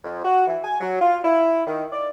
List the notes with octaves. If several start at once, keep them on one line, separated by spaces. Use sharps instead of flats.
F2
F#4
E3
G#5
F#3
F4
E4
D#3
D5